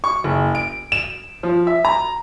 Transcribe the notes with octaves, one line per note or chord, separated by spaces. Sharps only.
C#6
F#1
D7
E7
F3
E5
A#5